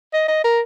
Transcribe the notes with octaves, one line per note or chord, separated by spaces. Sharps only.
D#5
D#5
A#4